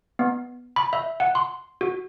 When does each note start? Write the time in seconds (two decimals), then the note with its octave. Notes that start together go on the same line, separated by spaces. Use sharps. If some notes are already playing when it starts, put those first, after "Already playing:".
0.19 B3
0.76 B5
0.93 E5
1.20 F#5
1.35 C6
1.81 F#4